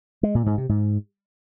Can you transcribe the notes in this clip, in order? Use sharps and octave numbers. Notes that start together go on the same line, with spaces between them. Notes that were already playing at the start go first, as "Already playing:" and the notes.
G#3
A#2
G#2
C3
G#2